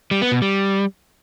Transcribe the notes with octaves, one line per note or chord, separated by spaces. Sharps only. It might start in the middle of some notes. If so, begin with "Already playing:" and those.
G3
B3
B2
G3